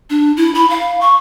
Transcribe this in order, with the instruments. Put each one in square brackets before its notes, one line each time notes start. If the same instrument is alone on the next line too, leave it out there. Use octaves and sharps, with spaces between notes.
[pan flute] D4
E4
B5
F5
C#6